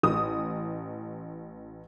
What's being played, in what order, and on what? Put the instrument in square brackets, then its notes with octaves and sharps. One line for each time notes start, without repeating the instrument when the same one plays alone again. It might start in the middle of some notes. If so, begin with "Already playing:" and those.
[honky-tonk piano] A1 D#6